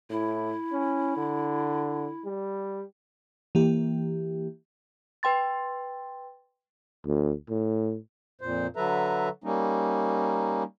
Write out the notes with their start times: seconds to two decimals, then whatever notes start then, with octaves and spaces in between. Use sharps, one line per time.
0.10 A2 E4
0.72 C#4
1.17 D3
2.25 G3
3.55 E3 A#3 G4
5.23 B4 G5 C6 A6
7.06 D2
7.50 A2
8.41 F2 A#2 C5
8.76 D3 F#3 A4 B4 E5 A#5
9.44 G3 A#3 C#4 D#4